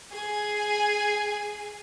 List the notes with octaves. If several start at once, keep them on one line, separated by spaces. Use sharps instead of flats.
G#4 G#5